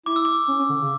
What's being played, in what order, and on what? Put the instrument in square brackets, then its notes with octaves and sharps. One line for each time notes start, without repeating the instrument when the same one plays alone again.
[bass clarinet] E4 [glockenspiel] D6
[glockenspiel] E6
D6
[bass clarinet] C#4
C#4
D3
C#3